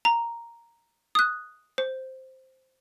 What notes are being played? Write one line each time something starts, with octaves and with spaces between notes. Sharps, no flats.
A#5
D#6 F#6
C5